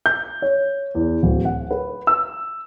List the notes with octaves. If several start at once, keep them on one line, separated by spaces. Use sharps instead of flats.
G6
C#5
E2
D1
F#5
B4
E6